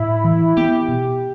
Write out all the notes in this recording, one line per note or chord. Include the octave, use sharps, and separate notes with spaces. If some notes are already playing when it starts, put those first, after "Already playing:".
Already playing: A2 E4
E3
B3 G4
B2